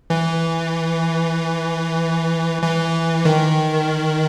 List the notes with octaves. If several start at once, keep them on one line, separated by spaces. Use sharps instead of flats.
E3
E3
D#3